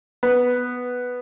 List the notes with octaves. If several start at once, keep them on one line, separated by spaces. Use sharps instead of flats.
B3